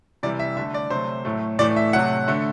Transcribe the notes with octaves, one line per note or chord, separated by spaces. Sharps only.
C3 E3 G3 D5
E5
D3 A3 E5
D5
C3 F#3 A3 C5
A2 F#3 A3
A2 E3 A3 D5
E5
C3 F#3 A3 F#5
D3 A3